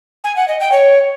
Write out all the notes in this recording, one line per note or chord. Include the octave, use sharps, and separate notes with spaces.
G#5
F#5
D#5
G5
C#5